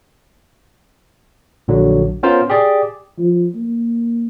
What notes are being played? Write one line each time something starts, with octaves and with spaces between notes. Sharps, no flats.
A#1 D3 F#3
B3 C#4 F4 A#4 C5
G4 G#4 D5
F3
A#3